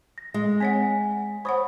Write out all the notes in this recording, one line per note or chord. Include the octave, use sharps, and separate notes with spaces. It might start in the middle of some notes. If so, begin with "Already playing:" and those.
A#6
G#3
C4 C#5 F#5 G#5 B6
C5 C#5 F#5 B5 C#6 D#6